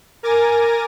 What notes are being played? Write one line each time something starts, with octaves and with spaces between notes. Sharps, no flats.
A#4 G#5 D6 A6 A#6